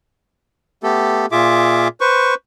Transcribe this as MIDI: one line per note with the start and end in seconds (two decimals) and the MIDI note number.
0.83 1.26 57
0.83 1.26 59
0.83 1.26 67
0.83 1.26 69
1.32 1.88 46
1.32 1.88 65
1.32 1.88 68
1.32 1.88 76
1.32 1.88 86
2.01 2.34 71
2.01 2.34 72
2.01 2.34 85